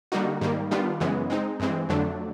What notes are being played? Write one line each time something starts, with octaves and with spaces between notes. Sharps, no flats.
D3 G3 A#3 D#4 F#4
G#2 D#3 G3 A#3
D#3 G3 B3 D4 F4
F#2 C#3 E3 G#3 B3
G#3 C4 D#4
G2 E3 G#3 C4
F2 D3 F#3 A3 D4